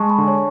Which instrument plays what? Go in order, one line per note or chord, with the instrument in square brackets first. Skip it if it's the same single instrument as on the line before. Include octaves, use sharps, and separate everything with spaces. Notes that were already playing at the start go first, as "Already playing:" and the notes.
Already playing: [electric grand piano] G#3 [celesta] A5 C#6
[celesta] G#5 B5
[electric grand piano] D3
[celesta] C#5